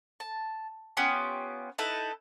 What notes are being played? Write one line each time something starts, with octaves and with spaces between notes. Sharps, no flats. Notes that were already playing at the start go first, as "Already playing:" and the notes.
A5
B3 C#4 F4 G4
D#4 E4 A4 B4